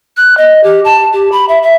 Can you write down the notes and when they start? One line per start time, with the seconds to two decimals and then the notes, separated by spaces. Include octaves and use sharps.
0.17 F#6
0.37 D#5
0.63 G4
0.85 A5
1.13 G4
1.32 B5
1.49 E5
1.62 E5